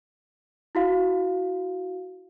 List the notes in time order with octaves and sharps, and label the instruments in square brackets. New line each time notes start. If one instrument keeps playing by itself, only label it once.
[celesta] E4 F#4 F5